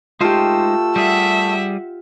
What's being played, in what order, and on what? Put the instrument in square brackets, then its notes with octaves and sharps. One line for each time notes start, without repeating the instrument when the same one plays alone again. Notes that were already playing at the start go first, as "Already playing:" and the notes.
[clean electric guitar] G#3 D#4 C5 [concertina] A3 E6 [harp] F4 G4
[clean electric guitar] G3 G#4 [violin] E5 F#5